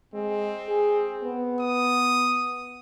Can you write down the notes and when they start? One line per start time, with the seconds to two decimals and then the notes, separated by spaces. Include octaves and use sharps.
0.14 G#3 C4
0.69 G#4
1.24 B3
1.59 D#6